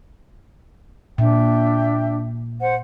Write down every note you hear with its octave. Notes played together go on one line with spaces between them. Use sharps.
A#2 D4 E5 G5
C5 F#5